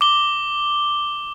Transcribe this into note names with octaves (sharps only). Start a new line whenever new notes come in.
D6 G7